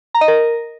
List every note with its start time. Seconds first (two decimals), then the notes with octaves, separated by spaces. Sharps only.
0.15 A#5
0.21 D#5
0.28 A#4